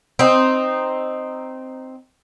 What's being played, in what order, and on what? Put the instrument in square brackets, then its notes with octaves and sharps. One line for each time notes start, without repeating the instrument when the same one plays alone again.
[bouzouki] C4 D#4